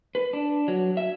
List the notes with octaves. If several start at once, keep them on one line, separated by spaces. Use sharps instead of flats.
B4
D4
F#3
E5